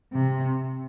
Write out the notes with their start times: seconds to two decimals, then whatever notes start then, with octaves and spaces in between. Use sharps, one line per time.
0.13 C3